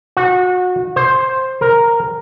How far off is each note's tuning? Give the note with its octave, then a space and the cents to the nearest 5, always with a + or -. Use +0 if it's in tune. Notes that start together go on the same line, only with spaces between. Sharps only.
F#4 -25
C5 +10
A#4 +0